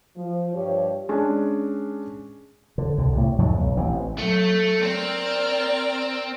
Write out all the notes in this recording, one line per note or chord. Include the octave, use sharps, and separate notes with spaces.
F3
G2 F3 G4 C#5
G#3 C#4 D4
D3
C2 D3
A2 C3
F2 G#2 F3 F#3
B1
A1 E3 C4
F#3 A3
C4 A#4 D5 F6